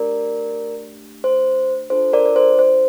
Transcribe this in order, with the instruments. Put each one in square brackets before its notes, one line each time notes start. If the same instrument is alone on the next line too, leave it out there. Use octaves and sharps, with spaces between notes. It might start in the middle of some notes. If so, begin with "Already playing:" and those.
Already playing: [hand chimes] A3 D4 G4 A#4 D5
C5
D4 F4 A4 C5
A#4 D5
D5
C5
C5